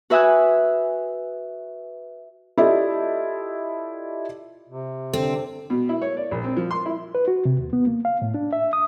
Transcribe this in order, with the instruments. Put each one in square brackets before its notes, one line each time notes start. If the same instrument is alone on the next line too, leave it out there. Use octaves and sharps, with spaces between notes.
[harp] F#4 B4 E5 G#5 D#6 F#6
[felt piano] E4 F4 G4 A4 D5 D#5
[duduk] C3
[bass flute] D3 [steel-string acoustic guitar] C4 [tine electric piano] A4 C5
[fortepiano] B2
E4
C#5
D5
A#1
C4
F3
C6
E4
[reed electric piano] B4
F#4
C3
D#2
B3
A#3
F5
A2
D4
E5
D#6